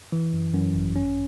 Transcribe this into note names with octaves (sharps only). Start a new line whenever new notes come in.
E3
F#2
F#2
G#1
C#4